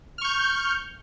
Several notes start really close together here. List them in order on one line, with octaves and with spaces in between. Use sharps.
F6 C#6 G6